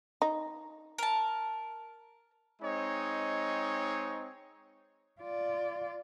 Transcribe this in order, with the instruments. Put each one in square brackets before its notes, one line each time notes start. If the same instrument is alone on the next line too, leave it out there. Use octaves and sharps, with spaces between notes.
[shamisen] D#4
[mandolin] A#4 A5
[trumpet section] G#3 C4 D#4 C#5
[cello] F4 D5